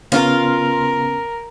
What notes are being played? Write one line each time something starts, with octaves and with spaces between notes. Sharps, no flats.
C#3 B3 C#4 F4 A#4